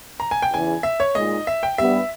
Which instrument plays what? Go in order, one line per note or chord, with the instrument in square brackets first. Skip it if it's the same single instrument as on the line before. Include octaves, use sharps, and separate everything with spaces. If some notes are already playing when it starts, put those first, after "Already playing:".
[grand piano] A#5
G#5
G5
[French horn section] E2 C#3 E3 [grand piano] G#5
[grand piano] E5
C#5
[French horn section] A#2 G#3 D#4 [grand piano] D#5
[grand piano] E5
G5
[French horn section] G2 G3 B3 [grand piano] E5